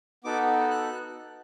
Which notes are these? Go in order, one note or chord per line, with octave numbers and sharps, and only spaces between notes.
B3 D#4 F#4 A4 D6
F#6